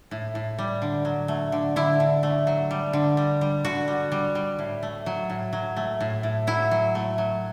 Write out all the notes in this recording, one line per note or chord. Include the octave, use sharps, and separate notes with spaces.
A2
A2
G3
D3
F#3
A3
D3
D3 E4
D3
A3
F#3
G3
D3
G3
G3
D3 F#4
G3
G3
G3
A2
A3
F#3
A2
F#3
A3
A2
A2
F#3 E4
F#3
A3
F#3